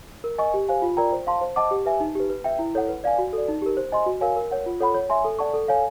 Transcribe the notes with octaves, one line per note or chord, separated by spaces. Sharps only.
A#4
D#5 G#5 C#6
G4
C5 F5 G#5
F4
A#4 D5 G5 A#5
C5
F5 A5 C6
C5
D#5 F#5 A5 D6
G4
B4 E5 G#5
D#4
G4 B4
B4
E5 G5
E4
A4 C#5 F#5
B4
D5 F5 G#5
F#4
A4 D5
D#4
G4 A#4
C5
D#5 G#5 C6
F#4
A#4 C#5 F5 G#5
A#4
C#5 F#5
F4
A4 C#5 F#5 B5
C#5
E5 G#5 C6
A4
D5 F#5 A5 C#6
A4
C#5 F5 G#5